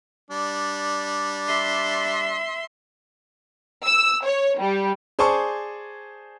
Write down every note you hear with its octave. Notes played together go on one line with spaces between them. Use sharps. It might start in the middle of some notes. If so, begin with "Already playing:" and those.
G3 D4
E5 C6
E6
C#5
G3
G#4 C5 D5 G#5 A5 C#6